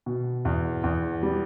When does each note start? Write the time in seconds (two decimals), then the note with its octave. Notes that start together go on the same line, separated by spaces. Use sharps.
0.06 B2
0.45 E2
0.84 E2
1.23 G3